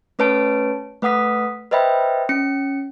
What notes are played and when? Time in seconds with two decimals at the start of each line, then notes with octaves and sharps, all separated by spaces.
0.19 A3 C#4 B4 C#5 A5 D7
1.02 A3 B4 F#5 D#6 B6
1.71 B4 C5 D#5 E5 G5 B5
2.29 C#4 C#7